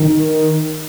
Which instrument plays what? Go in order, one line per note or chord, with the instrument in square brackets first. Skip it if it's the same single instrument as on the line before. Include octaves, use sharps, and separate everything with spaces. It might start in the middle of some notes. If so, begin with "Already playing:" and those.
Already playing: [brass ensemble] D#3